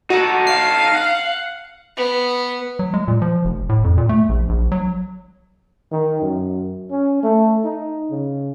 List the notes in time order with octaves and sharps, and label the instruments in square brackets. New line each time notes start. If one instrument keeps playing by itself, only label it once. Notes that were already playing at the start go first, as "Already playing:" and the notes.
[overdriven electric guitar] D#4 A4 [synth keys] F#4
[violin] F5 [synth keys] C7
[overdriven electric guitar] F#5
[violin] B3
[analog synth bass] F#3
G#3
A#2
F3
F1
A2
F2
A#2
A3
A#1
A#1
F#3
[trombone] D#3
F#2
C#4
A3
D#4
C#3